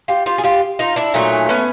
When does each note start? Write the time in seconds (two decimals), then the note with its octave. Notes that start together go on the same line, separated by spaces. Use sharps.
0.08 F4 G4
0.26 F4 G4
0.38 G#4
0.44 F4 G4
0.79 D#4 F4
0.96 D4 E4
1.14 A#2 F#3 A3 C#4 D#4
1.49 B3 C#4